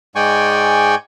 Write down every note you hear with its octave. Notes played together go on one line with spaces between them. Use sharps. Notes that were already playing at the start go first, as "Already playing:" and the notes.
G#2 G#3 D5 G5 G#5 C#6